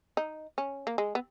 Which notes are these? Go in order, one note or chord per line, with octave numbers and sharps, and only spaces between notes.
D#4
C#4
A#3
G#3
B3